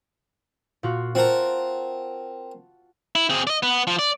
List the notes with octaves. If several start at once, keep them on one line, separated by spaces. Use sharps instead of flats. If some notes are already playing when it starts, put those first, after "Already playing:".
A#2 F4 F#4
C4 F4 A#4 F#5 A5
E4
C4 G#4
D5 D#5
B3
F3
D5